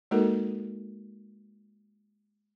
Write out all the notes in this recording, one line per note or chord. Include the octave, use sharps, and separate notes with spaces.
G#3 A#3 D#4 F#4 A4 A#4